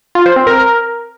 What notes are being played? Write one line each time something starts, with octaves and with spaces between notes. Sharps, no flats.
F4
C5
C4
A#4